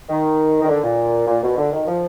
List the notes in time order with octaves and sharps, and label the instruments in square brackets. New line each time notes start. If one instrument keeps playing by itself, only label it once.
[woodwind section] D#3
D#3
D3
A#2
A#2
B2
D3
D#3
F3